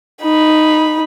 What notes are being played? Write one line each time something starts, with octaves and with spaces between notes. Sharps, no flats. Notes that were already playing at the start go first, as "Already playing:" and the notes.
D#4 B5